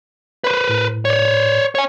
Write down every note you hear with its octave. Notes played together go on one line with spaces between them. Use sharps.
B4 C5
A2
C#5 D5
C#5 G#5